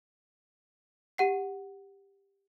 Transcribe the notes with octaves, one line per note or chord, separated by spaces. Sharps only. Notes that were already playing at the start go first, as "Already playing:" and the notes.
G4 F#5 C7